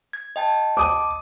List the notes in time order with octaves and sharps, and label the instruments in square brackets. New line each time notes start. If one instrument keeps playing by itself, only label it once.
[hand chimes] G#6
D#5 G5 A5
[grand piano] D6 D#6